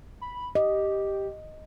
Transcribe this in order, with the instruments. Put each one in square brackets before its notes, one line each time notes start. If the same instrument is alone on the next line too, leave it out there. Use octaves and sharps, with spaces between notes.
[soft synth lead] B5
[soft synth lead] G4 [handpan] D#5